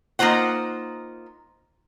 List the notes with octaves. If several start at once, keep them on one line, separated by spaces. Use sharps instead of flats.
A#3 D#4 F4 C5 F#5